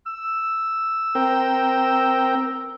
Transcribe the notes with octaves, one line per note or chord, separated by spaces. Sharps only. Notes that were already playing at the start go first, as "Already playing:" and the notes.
E6
C4 A#4 G5